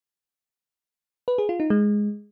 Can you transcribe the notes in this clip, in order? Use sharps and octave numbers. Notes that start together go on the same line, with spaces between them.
B4
G#4
F4
D#4
G#3